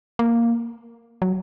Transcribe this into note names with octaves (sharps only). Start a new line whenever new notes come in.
A#3
F#3